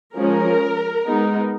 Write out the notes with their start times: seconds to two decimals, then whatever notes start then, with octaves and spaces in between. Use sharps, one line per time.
0.15 F3 G#3 C#4 A#4
1.05 G#3 B3 D#4